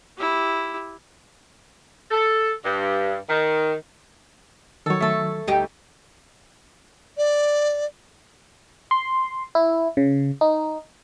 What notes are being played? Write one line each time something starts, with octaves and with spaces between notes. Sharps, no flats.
E4 G4
A4
G2
D#3
D#3 F#3 A4 C#5
A3 A4
D2 D#4 G4
D5
C6
E4
C#3
D#4